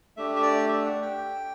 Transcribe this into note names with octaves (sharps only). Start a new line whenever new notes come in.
A3 D4 G4 E5
E5
D5
E5
F#5
G5